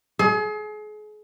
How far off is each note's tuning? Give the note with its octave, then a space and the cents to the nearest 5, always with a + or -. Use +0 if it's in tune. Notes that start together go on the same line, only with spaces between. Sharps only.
G#4 +35